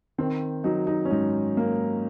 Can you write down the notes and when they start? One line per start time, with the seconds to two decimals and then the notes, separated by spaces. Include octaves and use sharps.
0.18 D#3 C4
0.64 F#3 D#4
0.87 D#4
1.05 C#4
1.11 G#2 D#4
1.57 A#3